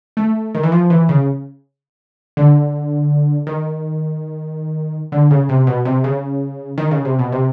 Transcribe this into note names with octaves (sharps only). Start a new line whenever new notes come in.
A3
D#3
E3
F3
E3
C#3
D3
D#3
D3
C#3
C3
B2
C3
C#3
D#3
C#3
C3
B2
C3